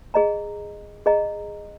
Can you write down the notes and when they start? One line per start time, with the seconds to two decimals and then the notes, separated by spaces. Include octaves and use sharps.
0.14 G#4 D#5 A#5
1.06 G#4 D#5 A#5